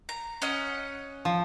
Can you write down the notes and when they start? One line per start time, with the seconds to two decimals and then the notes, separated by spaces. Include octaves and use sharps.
0.09 A#5
0.42 C#4 D#5 F#5
1.25 F3